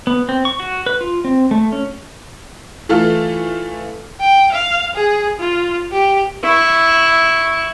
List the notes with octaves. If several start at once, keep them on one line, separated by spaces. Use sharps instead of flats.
B3
C4
C#6
F#4
B4
F4
C4
A3
C#4
E3 A3 F4 A4 F6
G5
F5
G#4
F4
G4
E4 C#6